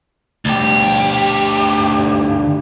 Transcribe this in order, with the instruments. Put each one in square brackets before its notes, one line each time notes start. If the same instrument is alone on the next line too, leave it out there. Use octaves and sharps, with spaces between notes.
[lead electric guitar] D2 G4